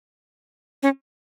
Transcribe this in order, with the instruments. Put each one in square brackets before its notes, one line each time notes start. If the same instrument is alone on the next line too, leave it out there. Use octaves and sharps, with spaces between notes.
[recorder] C#4